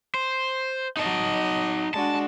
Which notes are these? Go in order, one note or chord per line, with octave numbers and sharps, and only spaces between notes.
C5
F#3 D#4 D#5 A5
G#3 D4 F#4 A5